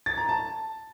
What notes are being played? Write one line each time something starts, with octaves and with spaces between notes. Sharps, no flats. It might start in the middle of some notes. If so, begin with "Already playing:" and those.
A6
A#5
A5